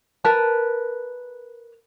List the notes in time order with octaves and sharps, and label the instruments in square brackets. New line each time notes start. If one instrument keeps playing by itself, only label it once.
[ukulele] A#4 B4 A5